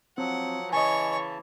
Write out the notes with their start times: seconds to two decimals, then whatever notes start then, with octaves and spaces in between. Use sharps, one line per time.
0.18 F3 F#3 C4 F#5
0.73 C#3 E3 C#5 D#5 G#5 A5 C#6